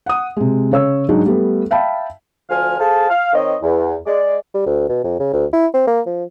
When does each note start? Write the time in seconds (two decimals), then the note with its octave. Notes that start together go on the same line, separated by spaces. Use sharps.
0.06 F#5 D#6
0.37 C3 G#3
0.71 C#3 C#5 E6
1.09 G#2 F#3 G#3 D4 D#4
1.26 G3 A3 B3
1.71 E5 F5 G5 A5 B5
2.49 D2 F3 G#5 F6
2.78 G#4 A4 C5 F5 A5
3.09 F5
3.33 D#3 C4 C#5 D#5
3.62 E2
4.06 G#3 D5
4.54 G3
4.66 D2
4.89 B2
5.04 F2
5.20 C#3
5.33 D2
5.53 E4
5.74 C4
5.87 A#3
6.06 F3